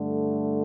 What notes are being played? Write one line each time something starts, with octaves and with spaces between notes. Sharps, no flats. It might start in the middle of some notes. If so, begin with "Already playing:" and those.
Already playing: G2 D3 A3